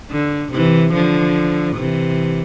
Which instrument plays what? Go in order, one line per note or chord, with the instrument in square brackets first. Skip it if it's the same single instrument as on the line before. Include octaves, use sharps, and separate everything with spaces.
[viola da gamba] D3
C3 E3
D3 F3
C3 E3